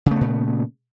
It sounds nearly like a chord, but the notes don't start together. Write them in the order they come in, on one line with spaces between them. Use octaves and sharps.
C#3 A3 B3 A#2